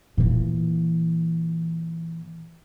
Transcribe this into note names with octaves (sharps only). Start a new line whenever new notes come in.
A#2 E3